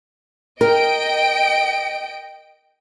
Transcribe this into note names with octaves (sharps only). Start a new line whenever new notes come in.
A#4 D#5 G5 D7